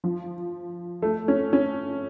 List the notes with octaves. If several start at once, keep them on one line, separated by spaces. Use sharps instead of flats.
F3
A3
C#4
C#4